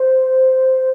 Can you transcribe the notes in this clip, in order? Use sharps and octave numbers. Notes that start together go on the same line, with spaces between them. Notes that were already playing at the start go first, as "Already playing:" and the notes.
Already playing: C5